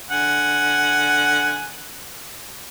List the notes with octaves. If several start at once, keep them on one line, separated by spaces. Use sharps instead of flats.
D3 F#5 G#5